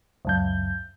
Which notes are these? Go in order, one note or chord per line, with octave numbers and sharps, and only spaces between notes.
C#2 F#2 G6